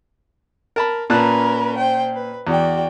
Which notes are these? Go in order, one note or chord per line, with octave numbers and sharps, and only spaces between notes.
A#4 A5 B5
A#2 C#4 A#4 B4 A5 F#6
C5 G5
B4
E2 F#4 D5 G5